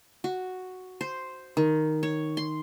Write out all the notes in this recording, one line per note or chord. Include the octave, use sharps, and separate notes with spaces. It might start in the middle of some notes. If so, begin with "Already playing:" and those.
F#4
C5
D#3
C#5
C6